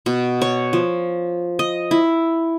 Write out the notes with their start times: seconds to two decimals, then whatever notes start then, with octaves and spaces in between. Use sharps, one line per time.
0.06 B2
0.42 C#5
0.73 F3
1.59 D#5
1.91 E4